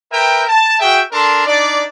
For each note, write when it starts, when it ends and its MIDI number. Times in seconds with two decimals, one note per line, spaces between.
0.11 0.42 70
0.11 0.42 71
0.11 0.42 76
0.11 0.42 79
0.48 0.79 81
0.80 1.00 66
0.80 1.00 68
0.80 1.00 76
0.80 1.00 79
1.12 1.44 62
1.12 1.44 69
1.12 1.44 70
1.12 1.44 81
1.12 1.44 84
1.46 1.83 62
1.46 1.83 63
1.46 1.83 74